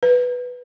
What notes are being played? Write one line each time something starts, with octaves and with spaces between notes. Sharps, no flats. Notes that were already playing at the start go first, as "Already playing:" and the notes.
B4